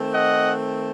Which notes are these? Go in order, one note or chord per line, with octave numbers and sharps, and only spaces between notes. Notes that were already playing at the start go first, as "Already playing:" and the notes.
Already playing: D#3 A3 C4
D#5 F#5